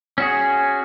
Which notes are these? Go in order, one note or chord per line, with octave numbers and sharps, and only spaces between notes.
C#4 F#4 G#4